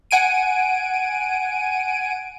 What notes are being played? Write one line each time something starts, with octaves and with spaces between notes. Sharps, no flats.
F#5 G#5 D7 D#7